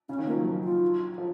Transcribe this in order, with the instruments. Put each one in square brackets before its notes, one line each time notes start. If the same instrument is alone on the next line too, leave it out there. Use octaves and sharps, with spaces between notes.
[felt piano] C#3 [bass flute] C#4
[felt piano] D#3
[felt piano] F3 [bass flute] A#3
[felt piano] F#3
[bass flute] F4
[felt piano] F3